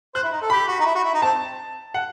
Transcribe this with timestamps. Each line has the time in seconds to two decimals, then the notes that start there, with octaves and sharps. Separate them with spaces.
0.15 C5 F#6
0.23 E4
0.32 D#4
0.41 A4
0.50 G4 B5
0.68 F#4
0.80 D#4
0.86 E4
0.95 F#4
1.04 E4
1.14 D#4
1.22 C4 A5
1.94 F#5